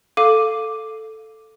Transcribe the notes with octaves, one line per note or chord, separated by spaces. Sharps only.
A4 F5 D6 D#7